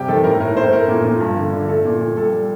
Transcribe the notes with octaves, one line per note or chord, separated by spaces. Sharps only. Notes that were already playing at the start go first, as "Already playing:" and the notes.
Already playing: C3 G3 G4
D#3 A4
A2 A#4
A2 A#4
A2 C5
A3 A#4
A#2
A#2
G2
D3
D3
A3 A4
A#2
A#2
G3 A4
G3